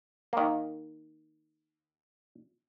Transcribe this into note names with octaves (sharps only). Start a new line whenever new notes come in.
D#3 A#3